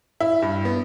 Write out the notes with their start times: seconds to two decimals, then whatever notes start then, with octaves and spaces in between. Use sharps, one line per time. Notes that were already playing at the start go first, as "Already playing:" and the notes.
0.21 E4
0.42 G2
0.65 B3